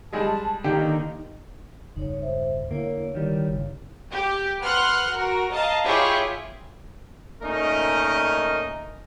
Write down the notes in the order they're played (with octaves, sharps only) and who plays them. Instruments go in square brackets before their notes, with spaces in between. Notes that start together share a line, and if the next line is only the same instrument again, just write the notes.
[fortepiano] G3 G#3 G#4 [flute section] A5
[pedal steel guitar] D3 D#3 A#3 [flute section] D#4 [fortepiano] G4
[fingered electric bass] E1 C#2 G2 [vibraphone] D#4 C#5
[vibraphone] C5 E5
[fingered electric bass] D3 [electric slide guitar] A#3 [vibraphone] E4 C#5
[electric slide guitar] D#3 G3
[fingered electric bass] G1 C#3
[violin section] G4
B4 F#5 C6 F6 F#6
F#4 A#4
D#5 F5 A5 A#5
E4 F4 G4 G#4 C#5 E5
[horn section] A#2 A3 C#4 D#4 A#4 D#5